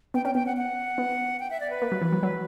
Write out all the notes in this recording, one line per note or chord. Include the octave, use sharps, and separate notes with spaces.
B3 G5
C#4 G5
B3 G5
F#5
F#5
B3
G5
E5
D5
B4
A#3
F#3
E3
F#3
F#3